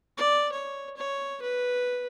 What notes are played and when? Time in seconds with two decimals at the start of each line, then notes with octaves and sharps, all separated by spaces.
0.18 D5
0.52 C#5
0.97 C#5
1.42 B4